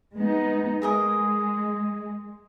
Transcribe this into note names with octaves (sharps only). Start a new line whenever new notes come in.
G#3 B3 D#4
G#3 G#4 A#4 D#5